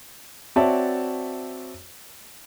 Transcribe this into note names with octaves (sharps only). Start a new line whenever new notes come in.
C4 F#4 C#5 D5 E5 A5